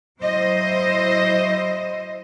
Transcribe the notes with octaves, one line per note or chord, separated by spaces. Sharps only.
F#3 E4 C5 D#5